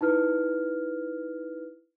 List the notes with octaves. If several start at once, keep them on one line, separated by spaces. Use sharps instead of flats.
D#4 E4 B4 F6